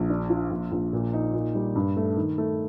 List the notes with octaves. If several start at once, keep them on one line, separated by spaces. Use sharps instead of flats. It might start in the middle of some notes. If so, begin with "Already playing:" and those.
Already playing: A#1
D4
F4
A#1
A#1
A#2
D#4
A#2
G3
G2
A3
D#3
A3